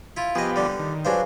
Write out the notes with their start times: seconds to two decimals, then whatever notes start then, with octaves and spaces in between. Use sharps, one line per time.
0.17 E4 F4
0.35 F3 B3 G4 G#4 D#5
0.56 D3 G3
0.79 D#3
1.05 F#3 D4 G#4 B4 C5 F5